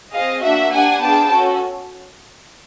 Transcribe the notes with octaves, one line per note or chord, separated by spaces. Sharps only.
C4 F4 G#4 D#5 F5
A#3 D4 F#4 E5 F#5
A#3 D4 G4 F#5 G#5
B3 D4 F4 G#4 G5 A5
C#4 F#4 A4